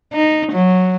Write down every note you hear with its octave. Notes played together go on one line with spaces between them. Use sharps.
D#4
F#3